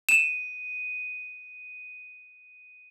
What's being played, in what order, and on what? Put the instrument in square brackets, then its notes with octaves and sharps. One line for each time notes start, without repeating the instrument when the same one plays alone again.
[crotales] D#7 [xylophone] E7